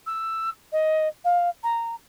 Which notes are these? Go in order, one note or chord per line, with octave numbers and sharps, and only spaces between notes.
E6
D#5
F5
A#5